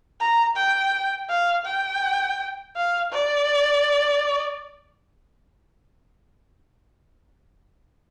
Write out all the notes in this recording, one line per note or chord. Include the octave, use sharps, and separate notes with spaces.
A#5
G5
F5
G5
F5
D5